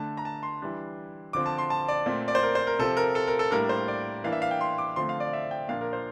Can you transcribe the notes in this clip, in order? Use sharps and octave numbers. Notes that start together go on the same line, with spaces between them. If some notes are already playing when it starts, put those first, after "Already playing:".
Already playing: D3 A3 D4 A5
A#5
A5
C6
E3 G3 D4
D3 F3 C4 D6
A5
C6
A5
D5
A#2 A3 C4
D5
C5
A#4
C5
A#4
C3 F3 C4 A4
A#4
A4
A#4
A4
A2 G3 A#3 D4 A#4
C5
D5
E3 A#3 D4 F5
E5
F5
G5
C6
D6
D3 F3 A3 C4 C6
F5
D5
E5
G5
A#2 F3 A#3 D4 F5
A#4
C5